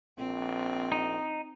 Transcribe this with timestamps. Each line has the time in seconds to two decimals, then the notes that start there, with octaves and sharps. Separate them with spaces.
0.18 A#1 C4
0.92 D#4